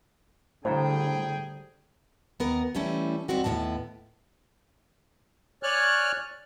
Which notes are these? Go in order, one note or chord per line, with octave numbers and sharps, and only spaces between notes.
A2 D3 G3 G#4 C5 F5 G5 A#5
D#2 B3 A#4
E3 G3 A3 C#4 E4
D#2 G#2 G3 C4 F#4 G4
D#2 A2 D#3 B3 A5
C#5 D5 G#5 F6 F#6